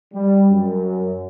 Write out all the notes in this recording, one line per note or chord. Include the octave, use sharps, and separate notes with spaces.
G3
F#2